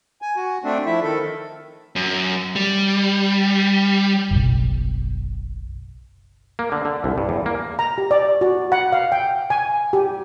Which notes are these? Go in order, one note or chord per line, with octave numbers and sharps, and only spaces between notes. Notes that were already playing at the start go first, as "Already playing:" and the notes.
G#5
F#4
A3 C4 D4
F3 E4 E5
D#3 A4
D#3
F#2
G3
F#1 B1
A#3
D3
D3
C2
G2
E2
A#3
A#5
G4
D5
F#4
F#5
F5
G5
G#5
G4